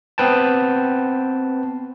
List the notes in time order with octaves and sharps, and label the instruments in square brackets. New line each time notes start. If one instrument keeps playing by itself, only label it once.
[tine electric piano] B3 C4 B4 G5 A5